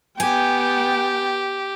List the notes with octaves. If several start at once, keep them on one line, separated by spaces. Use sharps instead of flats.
B3 G4 G5 G#5